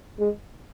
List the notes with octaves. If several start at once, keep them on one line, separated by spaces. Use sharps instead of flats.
G#3